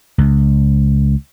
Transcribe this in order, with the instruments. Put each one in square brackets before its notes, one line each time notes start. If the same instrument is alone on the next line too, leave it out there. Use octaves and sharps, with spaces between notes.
[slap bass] C#2